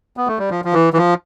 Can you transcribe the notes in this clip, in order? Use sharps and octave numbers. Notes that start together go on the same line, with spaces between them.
B3
A3
G3
F3
F3
E3
E3
F3